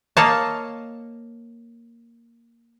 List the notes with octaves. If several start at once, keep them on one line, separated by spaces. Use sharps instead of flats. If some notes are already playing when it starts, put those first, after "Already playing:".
A#3 C#5 D#5 F5 A5